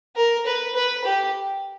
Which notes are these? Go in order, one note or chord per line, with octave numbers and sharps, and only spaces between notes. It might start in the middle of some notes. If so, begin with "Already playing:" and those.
A#4
B4
B4
G4